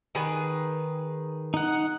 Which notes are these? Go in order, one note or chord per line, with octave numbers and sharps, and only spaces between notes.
D#3 G#4 B4
D#4 F#5